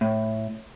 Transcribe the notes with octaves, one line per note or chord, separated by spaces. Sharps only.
A2